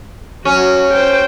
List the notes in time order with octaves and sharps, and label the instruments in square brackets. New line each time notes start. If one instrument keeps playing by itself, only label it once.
[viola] F#3 F#4 [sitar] C#4
[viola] C5 G5